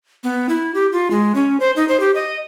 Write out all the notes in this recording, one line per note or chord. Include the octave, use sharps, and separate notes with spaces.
B3
E4
G4
F4
G#3
C#4
C5
D#4
C5
G4
D#5